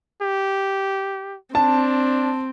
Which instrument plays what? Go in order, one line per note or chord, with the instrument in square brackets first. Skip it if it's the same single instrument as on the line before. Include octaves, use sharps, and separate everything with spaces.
[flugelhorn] G4
[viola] C4 [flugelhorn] D4 [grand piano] A5